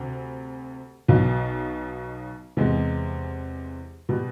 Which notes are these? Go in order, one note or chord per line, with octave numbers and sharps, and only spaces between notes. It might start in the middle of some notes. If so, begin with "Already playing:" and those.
Already playing: D2 C3
B1 B2 F#3
E2 C3 E3 G#3
B2 G3